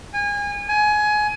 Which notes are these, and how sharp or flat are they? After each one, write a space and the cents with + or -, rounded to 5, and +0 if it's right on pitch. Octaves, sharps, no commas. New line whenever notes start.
G#5 -30
G#5 +20